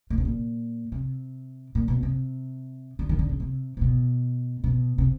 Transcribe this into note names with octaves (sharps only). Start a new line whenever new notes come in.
A#2
B2
A#2
C3
A#2
B2
C3
D3
D#3
D3
C#3
C3
C3
B2
B2
C3